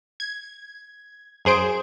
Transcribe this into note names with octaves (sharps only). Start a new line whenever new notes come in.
G#6
F#2 G#4 C5 D7